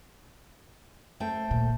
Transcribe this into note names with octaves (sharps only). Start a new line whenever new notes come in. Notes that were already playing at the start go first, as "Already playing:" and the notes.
A3 C5 G5
A#2